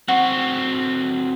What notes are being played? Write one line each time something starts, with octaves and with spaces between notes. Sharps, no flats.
F#3 C4 F#4